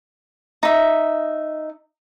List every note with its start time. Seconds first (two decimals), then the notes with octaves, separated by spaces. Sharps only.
0.63 D#4 E5